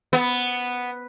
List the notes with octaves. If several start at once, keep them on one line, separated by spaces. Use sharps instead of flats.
B3